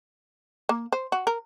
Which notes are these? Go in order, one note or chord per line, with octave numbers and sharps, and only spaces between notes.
A#3
C5
F#4
A#4